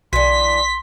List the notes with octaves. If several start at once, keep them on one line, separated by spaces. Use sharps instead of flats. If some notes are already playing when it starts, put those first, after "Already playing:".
B1 D3 E3 C6 B6